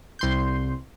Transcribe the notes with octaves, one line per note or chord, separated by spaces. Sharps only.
C2 C6 G6